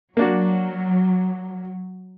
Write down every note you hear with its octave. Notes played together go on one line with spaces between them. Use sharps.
F#3 A#3 D4 F#4